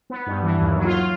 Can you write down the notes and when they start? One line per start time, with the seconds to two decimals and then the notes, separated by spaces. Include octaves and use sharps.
0.10 B3
0.26 G2
0.43 E3
0.59 D#2
0.76 F#3
0.85 F4